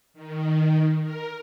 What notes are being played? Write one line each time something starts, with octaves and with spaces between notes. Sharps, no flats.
D#3
A#4